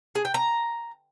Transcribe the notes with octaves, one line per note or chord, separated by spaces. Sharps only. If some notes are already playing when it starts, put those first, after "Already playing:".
G#4
G5
A#5